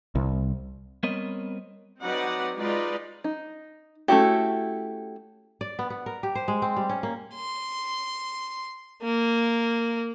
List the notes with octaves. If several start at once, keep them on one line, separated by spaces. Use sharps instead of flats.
C2
G3 B3 C4 A#4 C#5 D#5
F#3 C4 D#4 B4 D5 F#5
G#3 D#4 F4 B4 D5 D#5
D#4
A3 C#4 E4 F#4 G4
D5
B3
B3
A#4
G4
C5
G#3
C4
G3
C#4
A#3
C6
A#3